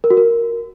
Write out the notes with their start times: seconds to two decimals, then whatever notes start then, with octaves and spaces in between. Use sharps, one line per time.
0.04 A#4
0.10 F#4
0.17 A#4